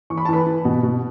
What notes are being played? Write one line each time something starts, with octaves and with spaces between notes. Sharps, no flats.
E3 C#6
B5
A5
E3 B4 B5
E3
B2
B2